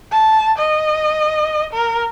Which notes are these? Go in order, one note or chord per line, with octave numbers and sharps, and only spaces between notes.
A5
D#5
A#4